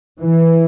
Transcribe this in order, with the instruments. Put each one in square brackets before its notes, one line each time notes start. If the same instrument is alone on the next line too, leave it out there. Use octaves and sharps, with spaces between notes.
[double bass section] E3